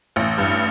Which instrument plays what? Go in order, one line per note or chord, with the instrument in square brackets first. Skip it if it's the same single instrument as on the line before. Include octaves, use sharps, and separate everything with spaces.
[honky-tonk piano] A1
G2